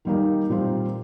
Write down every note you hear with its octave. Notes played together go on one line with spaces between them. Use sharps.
D#3 G3 A#3 D#4
A#2 G3 C4 F4